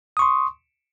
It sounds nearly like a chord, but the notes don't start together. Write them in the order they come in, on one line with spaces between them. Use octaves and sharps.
D#6 C#6 C6